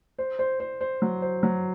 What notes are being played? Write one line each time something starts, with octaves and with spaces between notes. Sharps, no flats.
C5
C5
C5
C5
F#3
C5
F#3